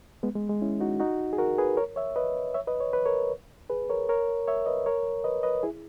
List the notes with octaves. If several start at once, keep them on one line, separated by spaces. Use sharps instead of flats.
G#3 B3
G#3
G#3
C#4 E4
D#4 F#4
D#4 F#4
G#4
F#4 A#4
G#4 B4
A#4 C#5
C#5 E5
B4 D#5
C#5 E5
B4 D#5
C#5
B4
A#4 C#5
G#4 B4
A#4 C#5
A#4 C#5
C#5 E5
B4 D#5
A#4 C#5
B4 D#5
B4 D#5
E4 G#4